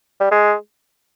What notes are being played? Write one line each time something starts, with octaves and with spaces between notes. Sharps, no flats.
G3
G#3